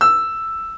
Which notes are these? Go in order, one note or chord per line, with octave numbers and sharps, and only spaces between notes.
E6